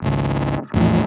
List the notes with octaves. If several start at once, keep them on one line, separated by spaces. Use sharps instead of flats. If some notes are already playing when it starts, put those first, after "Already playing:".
G#1 C#2
A#1 E2 A2 F3